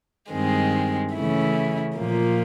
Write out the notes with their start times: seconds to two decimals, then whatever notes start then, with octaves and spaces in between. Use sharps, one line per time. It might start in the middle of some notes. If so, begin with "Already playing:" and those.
0.32 G2 D#3 G#3 C4
1.15 C#3 E3 A3 C#4 E4
1.97 A#2 F3 A#3